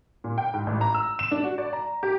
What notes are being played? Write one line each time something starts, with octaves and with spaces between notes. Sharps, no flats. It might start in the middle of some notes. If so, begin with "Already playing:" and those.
A#2
G5
G#2
A1
A#5
E6
E7
D4
F#4
D5
A#5
G4